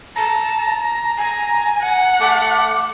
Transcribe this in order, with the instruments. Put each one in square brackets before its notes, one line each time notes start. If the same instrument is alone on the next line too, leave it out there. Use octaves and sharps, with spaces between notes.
[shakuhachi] A5 [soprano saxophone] A#5
[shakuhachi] G#5
[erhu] F#5
[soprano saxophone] A3 [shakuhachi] D6